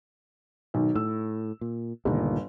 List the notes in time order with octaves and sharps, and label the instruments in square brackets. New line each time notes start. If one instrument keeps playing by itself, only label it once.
[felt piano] B1 D#3
[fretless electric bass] A2 [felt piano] E6
[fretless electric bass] A#2
[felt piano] G1 [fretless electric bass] C#2 A#2 D#3